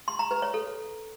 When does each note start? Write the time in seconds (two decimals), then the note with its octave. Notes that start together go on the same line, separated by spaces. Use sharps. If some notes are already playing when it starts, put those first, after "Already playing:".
0.08 C6
0.19 A#5
0.31 B4
0.42 C#5
0.54 A4